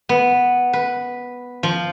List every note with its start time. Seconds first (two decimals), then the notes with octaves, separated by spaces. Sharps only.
0.09 B3
0.73 B4
1.63 F3